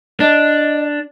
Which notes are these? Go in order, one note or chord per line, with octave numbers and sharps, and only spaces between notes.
D4 D#5